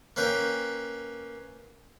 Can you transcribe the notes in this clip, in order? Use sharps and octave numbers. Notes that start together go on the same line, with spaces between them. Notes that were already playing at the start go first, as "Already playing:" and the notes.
A#3 C#4 B4 G5